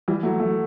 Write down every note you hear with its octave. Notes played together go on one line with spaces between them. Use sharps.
E3 G3
F#3 A3
F#3 A3